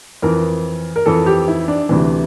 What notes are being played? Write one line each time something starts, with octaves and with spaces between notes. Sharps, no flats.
F2 E3 A#4
A#4
F2 E3 A4
G4
E4
D4
D2 C3 E3